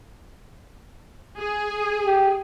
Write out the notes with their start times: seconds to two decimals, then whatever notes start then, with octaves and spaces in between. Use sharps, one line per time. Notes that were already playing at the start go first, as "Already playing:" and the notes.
1.39 G#4
2.06 G4